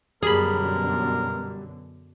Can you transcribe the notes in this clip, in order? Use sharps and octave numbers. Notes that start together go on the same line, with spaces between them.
F#2 B2 D3 G3 G#4 A#4 B5